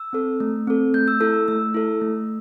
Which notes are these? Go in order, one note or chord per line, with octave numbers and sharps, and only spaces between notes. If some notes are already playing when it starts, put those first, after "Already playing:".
Already playing: E6
C4 A4
A3
C4 A4
A3 G6
E6
E4 A4 E6
E6
A3 E6
E4 A4
A3